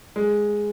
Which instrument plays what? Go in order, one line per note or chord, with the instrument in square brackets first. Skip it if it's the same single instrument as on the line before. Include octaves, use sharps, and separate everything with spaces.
[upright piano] G#3